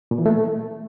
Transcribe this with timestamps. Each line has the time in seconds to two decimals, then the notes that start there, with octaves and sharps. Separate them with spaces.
0.11 A#2
0.18 E3
0.26 A3